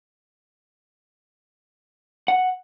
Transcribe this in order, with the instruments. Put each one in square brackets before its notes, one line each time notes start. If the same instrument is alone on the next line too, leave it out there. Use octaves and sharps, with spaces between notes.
[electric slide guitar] F#5